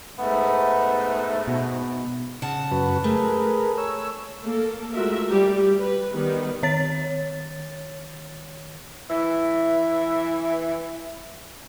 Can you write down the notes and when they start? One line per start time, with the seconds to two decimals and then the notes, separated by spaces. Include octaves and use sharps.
0.19 G#2 A3 B3
1.47 B2
2.42 C#3 F#5 A5
2.71 F#2 F#4 B4
3.04 A3 G#4 A#4 B4
3.78 C#5 E6
4.44 A#3 A4
4.93 G#3 A3 F4 F#4 A#4 E5
5.29 G3 G4
5.79 B4
6.13 D#3 G3 B3 B4
6.63 D#3 C#5 A6
9.09 E3 E5